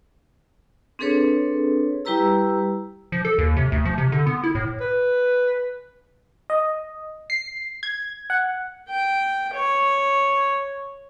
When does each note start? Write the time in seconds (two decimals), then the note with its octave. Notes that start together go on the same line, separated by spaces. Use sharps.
0.99 C4 D4 G#4 A4 B4 C#5
2.05 G3 E4 G4 B4 A#5 E6
3.12 F3
3.25 A4
3.38 D#2
3.57 C3
3.72 D2
3.85 F3
3.98 C3
4.12 D3
4.27 B3
4.44 E4
4.55 A2
4.81 B4
6.50 D#5
7.30 C7
7.83 G#6
8.30 F#5
8.89 G5
9.54 C#5